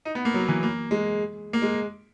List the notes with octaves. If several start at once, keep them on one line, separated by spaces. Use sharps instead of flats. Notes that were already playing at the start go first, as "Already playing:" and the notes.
D#4
B3
A#3
F#3
E3
A#3
G#3
A#3
G#3